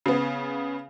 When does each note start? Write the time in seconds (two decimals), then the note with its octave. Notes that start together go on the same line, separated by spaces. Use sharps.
0.06 C#3 B3